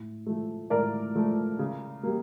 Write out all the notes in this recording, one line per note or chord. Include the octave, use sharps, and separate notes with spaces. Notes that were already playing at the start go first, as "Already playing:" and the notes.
Already playing: A2
F3 A3
A2 A#4 D5
F3 A3
C#3
G3 A#3